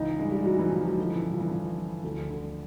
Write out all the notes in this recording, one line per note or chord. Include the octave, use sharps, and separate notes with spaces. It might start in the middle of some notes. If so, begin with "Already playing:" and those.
Already playing: C#2 E3 D#4
G2 G#3
G3
E3 F#3
E3
E3 F3
F#3
D3 F3
E3
G2
F3
E3
G2 F3
G2
D2
D3